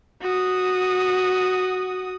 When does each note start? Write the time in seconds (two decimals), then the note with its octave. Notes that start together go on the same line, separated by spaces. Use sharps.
0.22 F#4 D#6